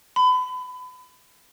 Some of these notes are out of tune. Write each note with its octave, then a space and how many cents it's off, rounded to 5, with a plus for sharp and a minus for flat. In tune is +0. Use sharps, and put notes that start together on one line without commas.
B5 +30